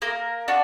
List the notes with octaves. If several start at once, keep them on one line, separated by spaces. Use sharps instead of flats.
A#3 A#4
D4 F#4